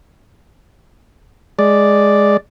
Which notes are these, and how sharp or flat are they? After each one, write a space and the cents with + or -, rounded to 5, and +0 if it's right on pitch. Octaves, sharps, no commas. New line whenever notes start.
G#3 +0 D5 +0